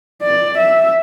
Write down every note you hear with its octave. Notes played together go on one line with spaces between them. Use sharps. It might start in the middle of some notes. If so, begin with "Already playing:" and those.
D5
E5